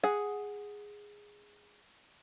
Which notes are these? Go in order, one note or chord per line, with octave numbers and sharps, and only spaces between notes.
G#4 F#5